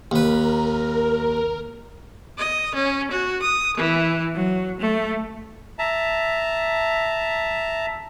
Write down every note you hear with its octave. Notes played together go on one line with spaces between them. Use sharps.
D#2 A#4 B4
D#5
C#4
F#4
D#6
E3
F#3
A3
E5 A5 A#5